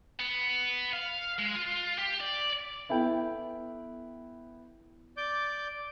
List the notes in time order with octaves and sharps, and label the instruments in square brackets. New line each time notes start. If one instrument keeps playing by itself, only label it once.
[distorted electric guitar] B3
F5
G#3
F4
G4
D5
[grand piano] B3 E4 A4 G5
[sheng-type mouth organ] D5 D6 G6